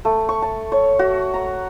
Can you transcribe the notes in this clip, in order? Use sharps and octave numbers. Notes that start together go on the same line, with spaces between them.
A3
C#6
A5
C#5
F#4
A#5